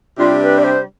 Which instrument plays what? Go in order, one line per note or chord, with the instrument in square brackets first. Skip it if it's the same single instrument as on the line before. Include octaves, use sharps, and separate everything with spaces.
[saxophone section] C3 G3 D4 [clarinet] F4
[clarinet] B4
D5
C5